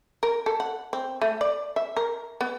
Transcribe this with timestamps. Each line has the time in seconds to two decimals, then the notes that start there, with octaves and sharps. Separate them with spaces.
0.23 A#4
0.46 A4
0.60 F#5
0.93 C4
1.22 A3
1.41 D5
1.76 E5
1.97 A#4
2.41 B3